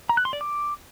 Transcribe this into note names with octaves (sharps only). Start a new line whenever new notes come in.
A#5
F#6
C6
D5
D6